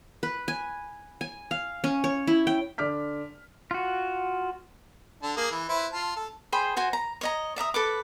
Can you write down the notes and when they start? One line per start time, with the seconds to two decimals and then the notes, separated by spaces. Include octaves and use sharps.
0.23 B4
0.48 G#5
1.21 G#5
1.51 F5
1.84 C#4
2.04 C#5
2.27 E4
2.47 G5
2.78 D3 D5 D6 F6 B6
3.71 F4 F#4
5.23 D3 D4
5.37 A#3 G#4
5.51 E3
5.69 E4 B4 C5
5.92 F4 A5
6.16 A4
6.52 G#4 C5 G5 B5
6.77 F#4 C5 G#5
6.93 A#5
7.21 C#5 D#5 A#5
7.56 D5 E5 A#5 D#6
7.74 A4 B4 D6